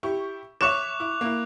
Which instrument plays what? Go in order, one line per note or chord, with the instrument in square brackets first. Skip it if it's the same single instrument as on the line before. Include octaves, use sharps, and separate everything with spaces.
[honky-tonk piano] E4 G4 C#6
[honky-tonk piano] C#5 E5 [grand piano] C#6 E7 [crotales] D6 F#6 F7
[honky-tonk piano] E4
A#3 E4